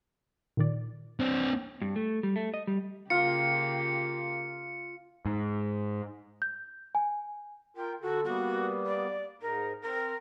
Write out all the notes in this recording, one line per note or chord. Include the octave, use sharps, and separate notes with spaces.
A#2 D#3 D5
C4 D4
G2
A3
G3
A3
D#5
G3
C#3 A#3 F4 G4 C#7
G#2
G6
G#5
F4 A#4 G5
D3 F#4 A4
G3 A#3 B3 F#4
D5
G#2 D#4 A#4
C4 A#4